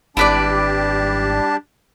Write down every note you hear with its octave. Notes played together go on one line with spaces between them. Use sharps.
G#1 G3 D4 E4 G4 B4 D5 A5